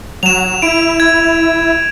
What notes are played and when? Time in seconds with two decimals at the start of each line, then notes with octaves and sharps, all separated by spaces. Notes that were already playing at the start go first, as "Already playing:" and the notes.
0.23 F#3 E7 F7
0.62 E4 D7
1.00 G#6